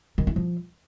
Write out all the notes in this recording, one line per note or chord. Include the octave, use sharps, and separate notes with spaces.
D#3
E4
F3